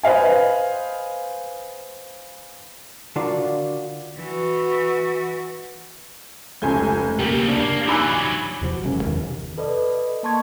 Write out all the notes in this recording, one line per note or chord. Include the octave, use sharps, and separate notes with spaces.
B4 C5 D#5 F5 G#5
D3 D4 F4 F#4 A#4 D5
E3 F#4
F1 C#2 A3 C#4 G#5 G6
C2 C#3 A#3 G4
D4 D5
A#3
F3 F#3 D#4 G#5 B5 D6 E6 F#6
E2 C3 F3 F#3
F#1 F#2 G#3 C#4
E2 C3 D#3
A4 B4 D5 D#5
D#5
A#3 D#5 A5 C6 C#6 G#6